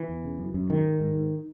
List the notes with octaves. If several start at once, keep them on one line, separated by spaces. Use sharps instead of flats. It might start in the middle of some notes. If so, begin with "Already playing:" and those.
Already playing: E3
E2
C#3
F#2
F#2
G#2 D#3
G#2
G#2
G#2